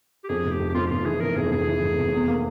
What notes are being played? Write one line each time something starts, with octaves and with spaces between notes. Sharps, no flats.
G4
F2 G#4
F1
G4
F2
G4
F2 F4
G4
F1 F4
E3 G#4
F1 A#4
F1 G#4
F1 G#4
E3
F1
F1
E2
A#3